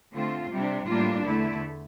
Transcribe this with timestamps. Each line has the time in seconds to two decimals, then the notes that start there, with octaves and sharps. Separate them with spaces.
0.12 D3 A3 C4 F4
0.50 C3 G3 D4
0.87 A2 G3 A#3 D4 F4
1.24 E2 D3 A3 E4